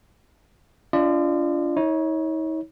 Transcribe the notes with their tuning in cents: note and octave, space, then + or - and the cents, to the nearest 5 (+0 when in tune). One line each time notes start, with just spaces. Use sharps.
D4 -40 F4 -30 D5 +40
D#4 +45 C#5 +0